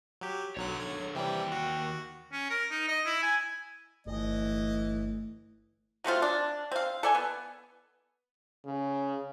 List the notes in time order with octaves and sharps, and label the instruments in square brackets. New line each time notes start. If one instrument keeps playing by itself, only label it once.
[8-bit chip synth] F#3 G4
[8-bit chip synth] B1 F#3 F#6 [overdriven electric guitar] D3 C#5
[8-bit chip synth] G#6
[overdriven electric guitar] D#2 G5 [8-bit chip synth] C3 E3 G3
[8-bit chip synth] F#4
[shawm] C#4
A#4
D#4
D#5
E4
G#5
[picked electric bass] G1 [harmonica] E3 D#5 [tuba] A3
[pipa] F#3 A3 C4 F4
D4
C4 F5
A4 D5 G#5
B3
[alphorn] C#3